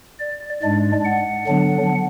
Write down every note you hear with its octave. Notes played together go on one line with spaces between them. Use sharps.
D5
G#2 G#3 D4 D5
F#5
D3 F#3 B3 D4